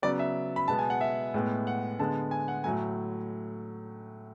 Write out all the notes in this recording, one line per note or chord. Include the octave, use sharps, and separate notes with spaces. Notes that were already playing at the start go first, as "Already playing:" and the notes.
C#3 F#3 B3 D5
E5
B5
B2 G#3 B3 A5
G#5
F#5
E5
A2 G#3 B3
F#5
D3 G#3 B3 A5
G#5
F#5
A2 F#3 A3 G#5